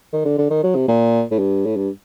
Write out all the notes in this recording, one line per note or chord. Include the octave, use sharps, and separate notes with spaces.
D#3
D3
D3
D#3
F#3
C3
A#2
A2
G2
A2
G2